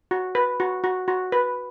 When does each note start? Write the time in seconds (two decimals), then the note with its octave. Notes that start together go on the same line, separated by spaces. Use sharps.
0.11 F#4
0.35 B4
0.60 F#4
0.84 F#4
1.08 F#4
1.32 B4